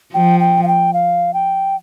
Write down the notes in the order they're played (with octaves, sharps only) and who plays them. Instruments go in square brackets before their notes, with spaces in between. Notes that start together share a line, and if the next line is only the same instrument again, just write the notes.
[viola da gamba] F3 [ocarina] G5
[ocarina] G5
F5
G5
F5
G5